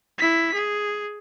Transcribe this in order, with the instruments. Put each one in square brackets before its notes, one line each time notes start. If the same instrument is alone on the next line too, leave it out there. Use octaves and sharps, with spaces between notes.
[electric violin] E4 B6
G#4